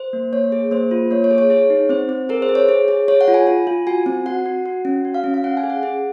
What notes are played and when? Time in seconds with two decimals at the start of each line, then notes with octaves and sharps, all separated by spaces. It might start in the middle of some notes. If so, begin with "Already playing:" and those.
Already playing: C5
0.13 A#3
0.33 A#3 C#5
0.52 G#4
0.71 A#3 C5
0.91 F4
1.11 A#3 C#5
1.24 C#5
1.31 G#4
1.38 C#5
1.50 G#4 C#5
1.70 D#4
1.89 C4 C5
2.09 C4
2.29 G#4 A#4
2.42 C5
2.49 G#4
2.55 C#5
2.69 G#4
2.88 G#4
3.08 G#4 C#5
3.21 F#5
3.28 F4
3.34 G#5
3.47 F4
3.67 F4
3.87 F#4 G#5
4.06 C4
4.26 F#4 F#5
4.46 F#4
4.66 F#4
4.85 C#4
5.05 F#4
5.14 F5
5.24 C#4
5.34 F5
5.44 C#4 F#5
5.57 G#5
5.63 G#4
5.70 F#5
5.83 G#4